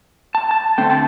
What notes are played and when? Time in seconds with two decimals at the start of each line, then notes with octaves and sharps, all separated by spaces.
0.35 A5
0.51 A5
0.78 D3 A3 C4 G5
0.90 A5